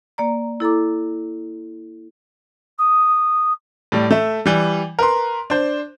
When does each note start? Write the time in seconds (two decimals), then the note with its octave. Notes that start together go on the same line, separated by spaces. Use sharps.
0.18 A#3 D5 A#5
0.60 E4 A4 A#5 D6
2.78 D#6
3.92 A2 G3
4.11 A3 E5
4.46 E3 G3
4.99 A#4 B4 C6
5.50 D4 C5